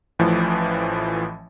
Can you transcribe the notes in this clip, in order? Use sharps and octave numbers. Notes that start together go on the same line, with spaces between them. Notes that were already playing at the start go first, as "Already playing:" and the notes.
A1 A2 E3 F3